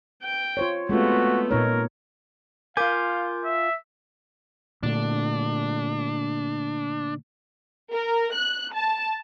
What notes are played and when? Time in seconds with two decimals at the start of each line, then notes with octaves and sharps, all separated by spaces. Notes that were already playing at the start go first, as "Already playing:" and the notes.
0.23 G5
0.57 F4 C5 C#5
0.89 G#3 A3 B3 C4 F4 F#4
1.51 A#2 D#4 A#4 C#5
2.77 F4 A#4 F5 G#5 D6 G6
3.45 E5
4.83 A#2 D3 A3 D4
7.93 A#4
8.34 F#6
8.74 A5